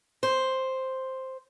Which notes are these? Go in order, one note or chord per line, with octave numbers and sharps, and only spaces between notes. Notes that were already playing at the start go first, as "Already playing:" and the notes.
C5